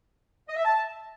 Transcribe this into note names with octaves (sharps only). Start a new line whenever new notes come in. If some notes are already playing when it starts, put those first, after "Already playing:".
D#5
E5
A5